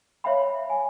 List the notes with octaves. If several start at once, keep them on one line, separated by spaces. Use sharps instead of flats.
C#5 E5 F5 G5 B5
G#5